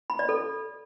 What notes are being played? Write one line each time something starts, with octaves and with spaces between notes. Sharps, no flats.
B5
D5
A4